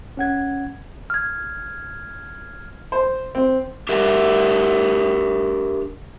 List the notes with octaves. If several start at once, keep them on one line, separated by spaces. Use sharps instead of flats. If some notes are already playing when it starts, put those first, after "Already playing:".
C#4 F#5 G#6
F6 G#6
C5
C4
D4 G4 A#4 E5